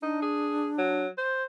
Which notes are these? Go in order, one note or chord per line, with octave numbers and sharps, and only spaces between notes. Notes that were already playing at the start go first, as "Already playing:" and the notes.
D4 D#4
G#4
F#3
C5